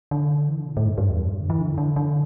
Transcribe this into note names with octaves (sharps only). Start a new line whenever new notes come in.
D3
E3
D3
B2
A2
G2
G2
E2
F#2
G2
D3
E3
D3
D3
D3